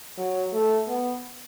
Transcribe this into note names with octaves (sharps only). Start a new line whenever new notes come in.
F#3
A3
B3